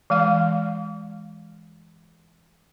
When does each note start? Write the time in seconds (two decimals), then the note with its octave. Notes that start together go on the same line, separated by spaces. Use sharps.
0.10 E3 G#3 F5